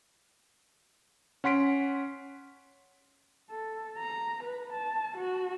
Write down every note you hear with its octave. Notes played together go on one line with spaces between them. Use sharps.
C#4 F#5 C6 B6 D7
A4
A#5
B4
A5
F#4